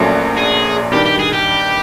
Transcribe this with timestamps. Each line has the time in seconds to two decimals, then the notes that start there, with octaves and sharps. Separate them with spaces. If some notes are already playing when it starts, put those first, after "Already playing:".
Already playing: A#1 A#2 F#3 A3 C#4
0.37 G#4
0.92 G2 D#3 G3 G4
1.05 G4
1.19 G#4
1.33 G4